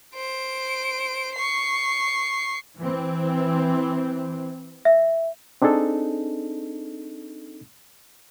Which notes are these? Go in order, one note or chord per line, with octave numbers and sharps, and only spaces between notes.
C5 D7
C#6 C7
E3 C4
E5
C4 D4 D#4 G#4 A4